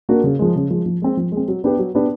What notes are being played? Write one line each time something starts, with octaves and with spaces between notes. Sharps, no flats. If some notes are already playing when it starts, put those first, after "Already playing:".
A#3 D4 F#4 A#4
C#3
F3 G#3
C#3
F3 G#3
F3
G#3 C4
F3
G#3
C4
F#3
B3 D4 G4 B4
F#3
B3 D4 G4 B4